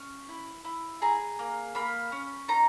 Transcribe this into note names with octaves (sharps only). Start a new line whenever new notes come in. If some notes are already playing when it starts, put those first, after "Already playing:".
Already playing: C#4
E4
E4
G#4 A#5
A#3
A#3 B5
C#4
D#4 A#5